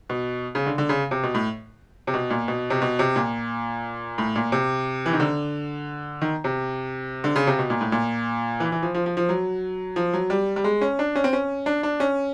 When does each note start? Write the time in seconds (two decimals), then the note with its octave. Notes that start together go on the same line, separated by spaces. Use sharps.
0.10 B2
0.55 C#3
0.66 D3
0.78 D3
0.89 C#3
1.11 C3
1.23 B2
1.34 A2
2.07 C3
2.14 B2
2.30 A#2
2.48 B2
2.70 C3
2.82 B2
2.99 C3
3.16 A#2
4.18 A2
4.36 A#2
4.52 C3
5.06 E3
5.13 D#3
5.20 D3
6.21 D#3
6.44 C3
7.24 D3
7.36 C#3
7.47 C3
7.59 B2
7.70 A#2
7.81 A2
7.92 A#2
8.60 E3
8.72 E3
8.83 F3
8.95 F3
9.06 F3
9.17 F3
9.29 F#3
9.96 F3
10.13 F#3
10.30 G3
10.56 G3
10.64 G#3
10.81 C#4
10.99 D4
11.15 C#4
11.24 C4
11.33 C#4
11.66 D4
11.83 D4
12.00 C#4